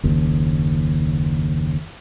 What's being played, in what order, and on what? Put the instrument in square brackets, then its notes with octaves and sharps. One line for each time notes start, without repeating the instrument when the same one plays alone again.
[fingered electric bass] F#1 D#2